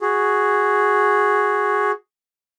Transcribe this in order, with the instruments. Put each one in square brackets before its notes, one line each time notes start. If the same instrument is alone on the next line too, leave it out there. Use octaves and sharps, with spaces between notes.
[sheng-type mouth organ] F#4 G#4